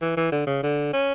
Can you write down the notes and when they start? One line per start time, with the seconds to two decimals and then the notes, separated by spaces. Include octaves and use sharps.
0.01 E3
0.17 E3
0.32 D3
0.47 C#3
0.63 D3
0.93 C#4